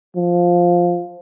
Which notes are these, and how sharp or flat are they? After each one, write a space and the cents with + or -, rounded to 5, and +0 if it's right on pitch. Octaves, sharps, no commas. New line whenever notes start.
F3 +5